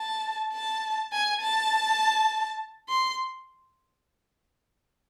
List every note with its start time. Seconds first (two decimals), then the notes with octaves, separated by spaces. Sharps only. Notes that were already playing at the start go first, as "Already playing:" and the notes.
Already playing: A5
0.53 A5
1.13 G#5
1.41 A5
2.89 C6